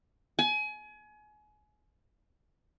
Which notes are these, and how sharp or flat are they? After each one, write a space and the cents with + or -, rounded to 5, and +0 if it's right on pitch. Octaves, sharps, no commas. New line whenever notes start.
G#5 +30